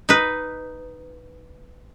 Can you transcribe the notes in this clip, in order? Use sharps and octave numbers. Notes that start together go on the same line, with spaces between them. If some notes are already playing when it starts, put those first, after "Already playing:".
D#4 B4